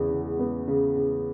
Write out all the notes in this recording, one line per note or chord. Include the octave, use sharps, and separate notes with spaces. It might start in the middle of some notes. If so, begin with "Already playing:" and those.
Already playing: E2 C#3 B3
C#3
B3
C#3
C#3